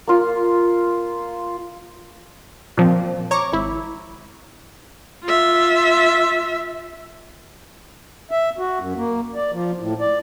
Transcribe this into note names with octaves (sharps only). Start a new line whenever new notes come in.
A#3 F4
A#2 F3 C4
C#5 A#5 C#6 D6
G#1 E4
F4 E5
E5
F#4
F#2
A#3
D5
F3
A2
D5